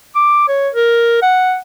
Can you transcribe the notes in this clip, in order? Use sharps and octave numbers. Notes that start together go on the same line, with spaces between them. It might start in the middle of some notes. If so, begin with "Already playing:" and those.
D6
C#5
A#4
F#5